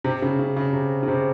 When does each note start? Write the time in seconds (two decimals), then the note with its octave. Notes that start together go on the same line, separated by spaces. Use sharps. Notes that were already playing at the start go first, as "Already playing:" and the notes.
0.04 C3
0.22 C#3
0.39 C#3
0.56 C#3
0.73 C3
1.03 C#3
1.08 C3